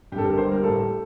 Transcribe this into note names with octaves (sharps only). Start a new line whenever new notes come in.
G2 G4
A4
G1 A#4
C5
G3
A#4
A2 A4